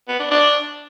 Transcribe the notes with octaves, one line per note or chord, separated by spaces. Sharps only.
B3
D4
D4